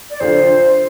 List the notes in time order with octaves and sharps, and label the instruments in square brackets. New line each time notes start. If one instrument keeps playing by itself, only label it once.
[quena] D5
[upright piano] F2 D3 F3 [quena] C5